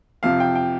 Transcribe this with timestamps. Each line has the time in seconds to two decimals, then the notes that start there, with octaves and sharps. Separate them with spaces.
0.23 F2 C3 F3 F5
0.40 G5
0.55 G5